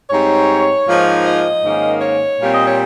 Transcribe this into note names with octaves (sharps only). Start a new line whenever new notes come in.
G#2 G3 C4 D#4 C#5
G#2 F3 A#3 D#4
D#5
G#2 D#3 A#3 C#4
C#5
A#2 G3 C4 F5
D#5
C#5